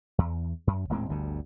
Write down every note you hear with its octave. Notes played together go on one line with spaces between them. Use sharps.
E2
F#2
D#1 A2 G#3 C4
G1 D2 G2 D3